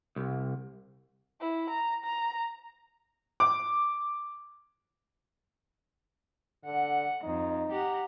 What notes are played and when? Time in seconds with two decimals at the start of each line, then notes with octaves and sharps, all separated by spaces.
0.16 C2
1.40 E4
1.70 A#5
2.04 A#5
3.40 D6
6.65 D3 F#5
7.23 F2 D#4
7.72 G4 F#5 A#5